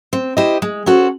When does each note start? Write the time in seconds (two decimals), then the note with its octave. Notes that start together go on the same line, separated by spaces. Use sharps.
0.13 C4
0.37 E4 G4 C5 D#5
0.62 G#3
0.86 C#4 F#4 A4 C5